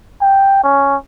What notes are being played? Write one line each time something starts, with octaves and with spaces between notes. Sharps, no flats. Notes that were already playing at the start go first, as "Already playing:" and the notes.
G5
C#4